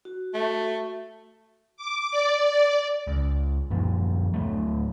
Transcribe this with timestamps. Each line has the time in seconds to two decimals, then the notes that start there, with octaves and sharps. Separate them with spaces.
0.05 F#4
0.34 A3
1.77 D6
2.12 D5
3.07 C#2
3.71 F#2 A#2 F3 A#3
4.34 D1 B1 F#3 A3